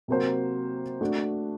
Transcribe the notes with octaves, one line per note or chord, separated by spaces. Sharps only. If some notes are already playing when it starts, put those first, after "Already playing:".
C3 F#3 A#3 F#4 C5
A3 D4 F#4